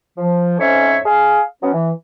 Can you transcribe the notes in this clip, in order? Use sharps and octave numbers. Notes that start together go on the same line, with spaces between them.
F3
F2 G#2 C#4 C#5 E5
G#4 F5
F#3 B3 C#4
E3